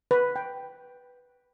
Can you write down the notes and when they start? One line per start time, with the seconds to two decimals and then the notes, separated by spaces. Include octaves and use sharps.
0.11 B4
0.36 G5